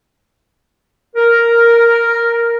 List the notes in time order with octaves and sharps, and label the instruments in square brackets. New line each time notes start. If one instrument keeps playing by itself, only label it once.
[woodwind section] A#4